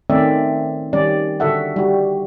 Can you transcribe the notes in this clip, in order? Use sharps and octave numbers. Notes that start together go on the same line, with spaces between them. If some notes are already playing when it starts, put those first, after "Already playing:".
D#3 A3 C4 C#4 D5 E5
D#3 G3 C#4 D5
D3 F#4 A4 E5 F#5
G3 F#4